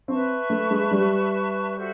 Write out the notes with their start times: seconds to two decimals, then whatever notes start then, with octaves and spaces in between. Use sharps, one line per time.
0.08 C4 B4 E5 A5 C#6
0.50 A3
0.71 G#3
0.91 G3
1.75 F#4 A4 C5 E5